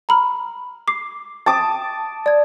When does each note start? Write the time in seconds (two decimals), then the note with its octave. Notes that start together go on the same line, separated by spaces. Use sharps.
0.09 A#5 B5 F6
0.88 D6 C7
1.46 G5 A5 D6 D#6
2.26 D5 G#6